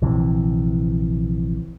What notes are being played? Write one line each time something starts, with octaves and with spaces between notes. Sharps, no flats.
A#1 C3 E3